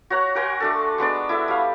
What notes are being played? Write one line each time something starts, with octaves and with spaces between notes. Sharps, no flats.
F#4 C#5 F#5 A#5
F#4 A#4 G#5 C6
A3 D4 A4
G#3 B3 D4 D5
E4 A4 E5
G3 F5